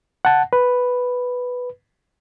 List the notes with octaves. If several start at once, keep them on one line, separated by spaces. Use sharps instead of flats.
F#5 A5
B4